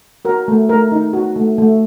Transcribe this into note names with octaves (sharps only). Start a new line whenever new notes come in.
F#4 A#4
A3
A3 A#4
D#4
F#4
A3
A3